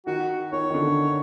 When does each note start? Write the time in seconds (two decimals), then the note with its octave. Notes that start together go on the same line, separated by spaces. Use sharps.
0.07 D#3 F#4
0.52 D#3 C#5
0.70 D#3
0.74 D3